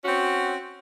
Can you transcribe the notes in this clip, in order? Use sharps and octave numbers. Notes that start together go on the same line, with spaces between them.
C4 C#4 F#4